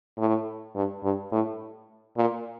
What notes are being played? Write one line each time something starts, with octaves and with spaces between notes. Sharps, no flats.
A2
G2
G2
A2
A#2